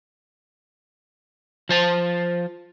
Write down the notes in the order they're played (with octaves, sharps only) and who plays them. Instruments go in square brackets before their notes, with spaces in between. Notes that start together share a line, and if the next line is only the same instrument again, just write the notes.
[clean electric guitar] F3 C5 A5